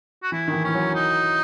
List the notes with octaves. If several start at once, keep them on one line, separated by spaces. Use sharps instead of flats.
F#4
E3 E4
D#3
E3
E3 C#4
F#3
D#4